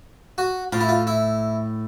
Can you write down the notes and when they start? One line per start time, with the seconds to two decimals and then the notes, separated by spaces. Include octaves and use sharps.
0.38 F#4
0.72 A2 F4
0.81 E4
0.89 F4
1.07 E4